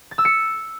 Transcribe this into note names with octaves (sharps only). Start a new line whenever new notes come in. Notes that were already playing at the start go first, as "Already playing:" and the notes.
A6
E6
C#7